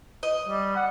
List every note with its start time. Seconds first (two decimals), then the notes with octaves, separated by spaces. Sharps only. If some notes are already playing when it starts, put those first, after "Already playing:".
0.23 D#5
0.49 G3
0.75 F#5